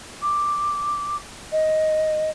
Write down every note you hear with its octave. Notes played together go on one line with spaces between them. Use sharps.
D6
D#5